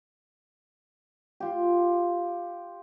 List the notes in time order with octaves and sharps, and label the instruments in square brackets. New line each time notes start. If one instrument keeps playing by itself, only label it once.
[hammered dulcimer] F4 G4